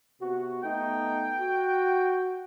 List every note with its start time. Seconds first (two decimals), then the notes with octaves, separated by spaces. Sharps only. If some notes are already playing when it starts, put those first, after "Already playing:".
0.20 C3 B3 F#4
0.63 A3 B3 D#4 G5
1.40 F#4